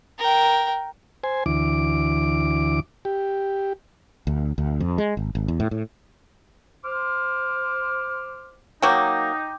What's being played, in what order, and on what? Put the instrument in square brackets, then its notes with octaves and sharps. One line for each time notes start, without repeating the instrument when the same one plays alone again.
[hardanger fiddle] A#4 G5
[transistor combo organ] C5 G#5
D2 E3 D6
G4
[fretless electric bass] D2
D2
F2
G#3
G#1
G#1
E2
A2
A2
[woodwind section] C5 D6 F6
[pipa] F#3 A#3 [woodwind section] D#4 [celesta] G5 D6 G6